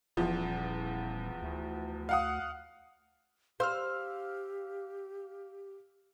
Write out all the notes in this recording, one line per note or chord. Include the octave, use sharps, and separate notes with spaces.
D#1 E2 F3
D2
F5 F#5 D#6
G4 C5 F5 E6 F6